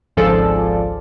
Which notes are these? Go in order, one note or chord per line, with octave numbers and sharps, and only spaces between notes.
G#1 C#2 F3 G#4 A4 D5